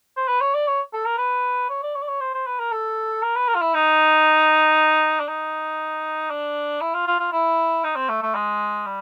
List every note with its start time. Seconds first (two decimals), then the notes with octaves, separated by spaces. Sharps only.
0.16 C5
0.28 B4
0.41 C#5
0.54 D5
0.67 C#5
0.93 A4
1.06 A#4
1.18 B4
1.69 C#5
1.83 D5
1.95 C#5
2.02 D5
2.08 C#5
2.20 C5
2.34 C5
2.47 B4
2.59 A#4
2.72 A4
3.22 A#4
3.36 B4
3.48 A#4
3.55 F4
3.61 E4
3.74 D#4
5.20 D4
5.28 D#4
6.30 D4
6.81 E4
6.94 F4
7.07 F4
7.20 F4
7.32 E4
7.84 D#4
7.96 C4
8.09 A3
8.22 A3
8.35 G#3
8.86 G3